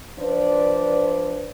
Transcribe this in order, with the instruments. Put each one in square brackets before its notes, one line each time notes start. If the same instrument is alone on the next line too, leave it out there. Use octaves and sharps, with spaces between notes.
[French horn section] F3 D4 B4 D5